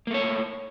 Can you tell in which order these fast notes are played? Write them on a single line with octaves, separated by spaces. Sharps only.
A#3 A3 C#5